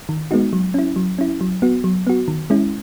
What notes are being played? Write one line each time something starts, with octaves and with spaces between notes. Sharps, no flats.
D#3
G#3 B3 D#4 F#4
F#3
C#4 E4
F#3
C#4 E4
F#3
B3 F#4
F#3
B3 F#4
D#3
G#3 C#4 E4